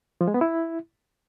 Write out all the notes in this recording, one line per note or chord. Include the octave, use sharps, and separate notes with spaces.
F3
G#3
B3
E4